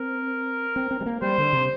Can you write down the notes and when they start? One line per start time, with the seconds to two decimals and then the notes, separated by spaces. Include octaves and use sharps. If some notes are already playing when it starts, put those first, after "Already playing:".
Already playing: C4 A#4
0.76 C4
0.91 C4
1.01 G3
1.06 A#3
1.22 G3 C5
1.38 D3
1.53 C3